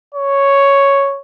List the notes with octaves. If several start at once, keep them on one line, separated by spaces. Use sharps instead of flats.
C#5